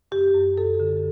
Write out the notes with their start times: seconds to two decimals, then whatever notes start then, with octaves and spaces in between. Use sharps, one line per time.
0.12 F#2 G4
0.35 F#2
0.58 F#2 A4
0.80 D3